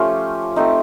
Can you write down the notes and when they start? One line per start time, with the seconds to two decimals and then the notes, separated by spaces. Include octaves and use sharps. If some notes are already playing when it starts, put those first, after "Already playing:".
Already playing: F3 A3 C#4 F4 G4
0.56 A3 C4 D#4